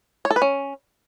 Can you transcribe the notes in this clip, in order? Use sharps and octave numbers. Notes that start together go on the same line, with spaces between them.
C#5
A4
B4
C#4